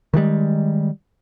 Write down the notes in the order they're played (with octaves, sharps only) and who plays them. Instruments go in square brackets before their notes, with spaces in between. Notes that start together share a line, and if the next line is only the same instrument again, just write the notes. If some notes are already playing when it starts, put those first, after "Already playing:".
[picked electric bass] D#3 E3 G3 G#3